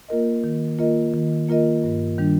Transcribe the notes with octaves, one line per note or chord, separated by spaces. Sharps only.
A#3 F4 A#4 D#5
D#3
A#3 F4 A#4 D#5
D#3
A#3 F4 A#4 D#5
G2
D#3 G3 D4